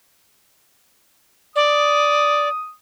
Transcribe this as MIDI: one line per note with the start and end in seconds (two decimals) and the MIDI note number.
1.56 2.48 74
1.56 2.72 87